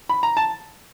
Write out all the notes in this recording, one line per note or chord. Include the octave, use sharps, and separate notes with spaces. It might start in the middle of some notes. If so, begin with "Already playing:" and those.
B5
A#5
A5